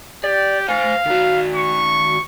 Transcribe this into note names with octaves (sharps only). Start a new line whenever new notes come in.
G4 D5
C5 F5 G#5
D#3 F#4
C#6